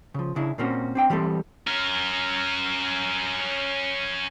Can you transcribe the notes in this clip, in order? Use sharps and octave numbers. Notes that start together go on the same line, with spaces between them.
C#3 F3
C#3 D4 E4
A#2 A#3 C4 C#4 F#4
C4 D4 G5
E3 G3 A3 C4 A4
C#4 A#4